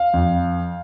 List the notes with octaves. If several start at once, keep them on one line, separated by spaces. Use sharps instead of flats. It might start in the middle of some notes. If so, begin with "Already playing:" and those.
Already playing: F5
F2